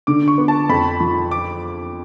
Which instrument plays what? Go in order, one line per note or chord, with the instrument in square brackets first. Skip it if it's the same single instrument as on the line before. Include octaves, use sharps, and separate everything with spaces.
[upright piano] D3 [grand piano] D6
[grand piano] C#6
[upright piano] B3
[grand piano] A5
[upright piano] F2 [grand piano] B5
[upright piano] F3
[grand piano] D6